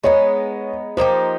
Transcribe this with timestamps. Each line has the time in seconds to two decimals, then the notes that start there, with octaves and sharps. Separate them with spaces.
0.04 G#3 B3 D#4 C#5
0.97 F3 A#3 D#4 G4 C5